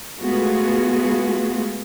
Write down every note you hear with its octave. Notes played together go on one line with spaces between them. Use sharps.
G#3 A3 B3 F4 F#4 G#4